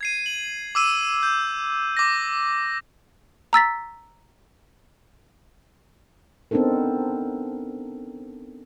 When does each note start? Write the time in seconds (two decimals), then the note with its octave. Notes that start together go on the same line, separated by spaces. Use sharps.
0.01 G#6 C7 D#7
0.26 F#7
0.75 D6 E6 D#7
1.23 G6
1.97 D6 A#6
3.53 A#5 E6 A6 B6
6.51 B3 C4 D4 D#4 A4 A#4